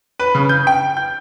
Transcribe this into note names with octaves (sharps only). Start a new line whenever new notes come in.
B4
C#3
G6
G5
G6